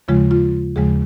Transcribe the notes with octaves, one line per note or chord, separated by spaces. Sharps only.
D#2 C#3 F3 G#3 F4
F4
D#2 C#3 F3 G#3 G#4